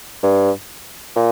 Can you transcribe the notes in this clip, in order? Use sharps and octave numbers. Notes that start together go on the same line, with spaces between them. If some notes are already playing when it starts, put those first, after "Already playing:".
G2
A#2